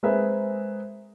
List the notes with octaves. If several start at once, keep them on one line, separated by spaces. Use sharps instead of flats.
G#3 C4 G#4 A#4 B4 E5